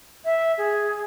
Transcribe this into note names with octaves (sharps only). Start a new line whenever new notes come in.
E5
G#4